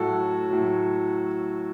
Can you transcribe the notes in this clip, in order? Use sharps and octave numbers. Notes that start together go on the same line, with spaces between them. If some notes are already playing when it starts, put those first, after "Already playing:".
Already playing: A2 F#3 F#4 A4
A2 F#3